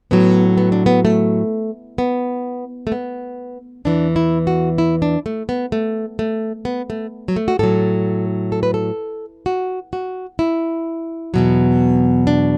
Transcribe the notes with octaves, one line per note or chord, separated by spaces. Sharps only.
A2 F#3 B3
B3
D4
B3
A3
B3
A3
B3
E2 E3 D4
E4
F#4
E4
D4
A3
B3
A3
A3
B3
A3
F#3
A3
F#4
A2 F#3 A4
A4
B4
A4
F#4
F#4
E4
E2 B2 F#3
D4